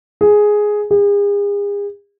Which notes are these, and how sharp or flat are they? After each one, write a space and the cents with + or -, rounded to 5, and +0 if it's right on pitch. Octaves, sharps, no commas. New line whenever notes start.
G#4 +5
G#4 -40